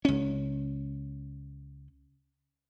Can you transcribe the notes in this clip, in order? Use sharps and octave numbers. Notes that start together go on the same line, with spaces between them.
C#2 C#4